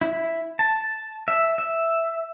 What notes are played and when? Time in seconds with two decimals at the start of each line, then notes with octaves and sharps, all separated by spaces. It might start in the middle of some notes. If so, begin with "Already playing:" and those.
0.01 E4
0.59 A5
1.28 E5
1.58 E5